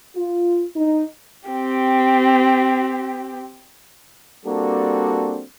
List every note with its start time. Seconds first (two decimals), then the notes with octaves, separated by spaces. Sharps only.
0.15 F4
0.76 D#4
1.49 C4 G4
4.45 G3 A#3 C4 D4 F#4 A4